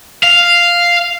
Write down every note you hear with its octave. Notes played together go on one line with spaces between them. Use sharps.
F5